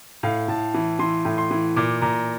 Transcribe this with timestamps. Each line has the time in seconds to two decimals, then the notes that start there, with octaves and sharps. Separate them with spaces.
0.23 A2 F5
0.48 A2 A5
0.74 E3
0.99 E3 C6
1.25 A2
1.38 C6
1.51 E3
1.76 A#2 D6
2.02 A#2 A#5